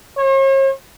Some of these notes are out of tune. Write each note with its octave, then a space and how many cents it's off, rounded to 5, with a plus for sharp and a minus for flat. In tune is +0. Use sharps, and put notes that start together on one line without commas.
C#5 -45